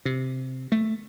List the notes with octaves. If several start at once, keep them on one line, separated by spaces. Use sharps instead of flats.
C3
A3